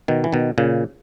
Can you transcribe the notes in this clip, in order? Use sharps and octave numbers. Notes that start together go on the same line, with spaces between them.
B2 D#3
E3
B2 D#3
A#2 C#3